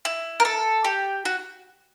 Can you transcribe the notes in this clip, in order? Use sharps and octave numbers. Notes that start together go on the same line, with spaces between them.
E4
A#4
A4
G4
F#4